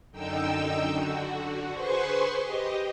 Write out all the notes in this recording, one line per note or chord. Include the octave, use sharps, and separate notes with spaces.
F#2 D3 D#4 G5 E6
D3 F#4
G#4 B4 C5 C6 C#6
G4 D#5